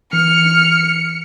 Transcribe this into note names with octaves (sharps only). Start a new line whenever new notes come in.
E3 F6 C#7